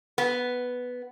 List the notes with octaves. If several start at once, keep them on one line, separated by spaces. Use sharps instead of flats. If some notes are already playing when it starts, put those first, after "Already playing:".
B3